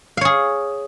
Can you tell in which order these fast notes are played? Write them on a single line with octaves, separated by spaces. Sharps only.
F5 C#5 G#4